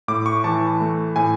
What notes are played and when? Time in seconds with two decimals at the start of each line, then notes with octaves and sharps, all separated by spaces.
0.08 A2 D6
0.26 C#6
0.44 E3 A5
0.80 A3
1.16 A2 G#5